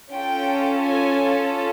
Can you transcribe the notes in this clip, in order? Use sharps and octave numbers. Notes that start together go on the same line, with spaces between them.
C#4 F4 A4 G5
G#5